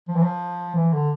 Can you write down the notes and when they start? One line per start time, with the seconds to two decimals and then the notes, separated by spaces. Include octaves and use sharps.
0.08 F3
0.16 E3
0.23 F3
0.76 E3
0.93 D3